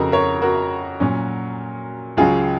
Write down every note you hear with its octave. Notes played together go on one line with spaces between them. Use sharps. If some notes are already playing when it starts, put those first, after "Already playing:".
Already playing: F2 C#3 F3 F#4 A#4
A#4 C#5
F#4 A#4
A#2 F#3 C#4
C#2 C#3 F#3 F4 G#4